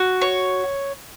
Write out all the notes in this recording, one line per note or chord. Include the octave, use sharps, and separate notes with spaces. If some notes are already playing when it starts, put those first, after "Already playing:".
Already playing: F#4
C#5